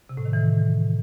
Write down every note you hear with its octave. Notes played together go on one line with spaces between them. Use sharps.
C3
A2
D#3
E3